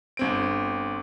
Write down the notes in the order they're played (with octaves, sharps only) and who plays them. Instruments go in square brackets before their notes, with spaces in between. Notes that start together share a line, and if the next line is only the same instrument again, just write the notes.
[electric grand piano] G1 C4 D7